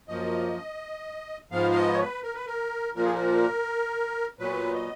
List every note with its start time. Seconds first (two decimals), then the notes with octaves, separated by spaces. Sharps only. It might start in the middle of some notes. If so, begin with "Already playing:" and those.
0.07 F#2 F3 A#3 D#5
1.51 G#2 F3 B3 F5
1.71 F5
1.75 D#5
1.93 C#5
1.99 B4
2.23 A#4
2.34 B4
2.46 A#4
2.95 A#2 F3 A#3 A#4
3.05 G#4
3.14 A#4
4.39 A#2 F#3 B3 B4
4.74 D#5